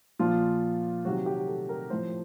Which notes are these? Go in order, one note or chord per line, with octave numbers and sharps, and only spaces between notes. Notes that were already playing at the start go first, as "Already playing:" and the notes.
A#2 F3 F4
C3 D#3 F#3 F#4
G4
A4
A#4
A2 F3 C5